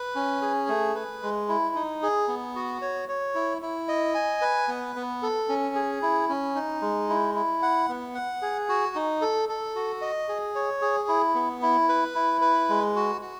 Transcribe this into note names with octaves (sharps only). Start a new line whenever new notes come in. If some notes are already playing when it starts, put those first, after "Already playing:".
Already playing: B4
C#4
G#4
A3
B4
G#3
E4
D#4
G#4
B3
F#4
C#5
C#5
E4
E4
D#5
G#5
B4
B3
B3
A4
C#4
G#4
E4
C#4
D#4
G#3
E4
E4
F#5
B3
F#5
G#4
F#4
D#4
A4
A4
F#4
D#5
G#4
C#5
G#4
E4
B3
E4
B4
E4
B4
G#3
F#4
F#4